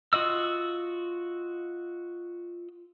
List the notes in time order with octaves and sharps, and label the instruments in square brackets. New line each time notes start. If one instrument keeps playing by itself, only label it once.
[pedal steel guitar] F4 F#4 D#5 E6